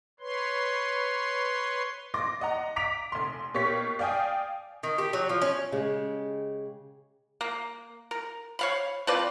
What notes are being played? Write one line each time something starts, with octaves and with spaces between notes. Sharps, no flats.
B4 C#5 C6
C6 D6 A6 A#6
D#5 F#5 A#5
A#5 D6 B6 D7 F7
F1 C6
B2 A#3 G4 C#5 C#6 B6
D5 F5 G5 G#5 D#6
D#3
G4
F#3
F3
C#4
C#3 G#3 G4
A#3
A#4
C#5 F5 B5
F3 C4 B4 D5